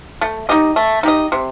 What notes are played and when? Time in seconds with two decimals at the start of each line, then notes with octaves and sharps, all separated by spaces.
0.21 A3
0.49 D#4 G4 D#5
0.76 A3
1.03 D#4 G4 D#5
1.32 C3